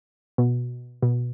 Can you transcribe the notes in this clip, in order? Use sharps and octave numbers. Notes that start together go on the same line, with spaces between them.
B2
B2